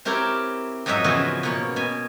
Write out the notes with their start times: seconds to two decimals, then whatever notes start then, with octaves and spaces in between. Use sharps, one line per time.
0.05 C4 E4 G4 A#4 C#5
0.86 F2 G#2 F#3 D#5 E5
1.04 C#3 E3 F3 B3 F#4 G#4
1.43 B2 A#3 C#5
1.76 B2 G#5